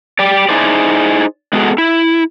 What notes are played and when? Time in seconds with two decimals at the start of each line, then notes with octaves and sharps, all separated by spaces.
0.19 G4 D5
0.49 D#4 E4 G#4 C5 D5
1.53 G#3 B3 F#4 G#4 A4
1.78 E4